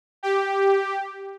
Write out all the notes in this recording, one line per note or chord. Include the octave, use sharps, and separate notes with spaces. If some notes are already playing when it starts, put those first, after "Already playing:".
G4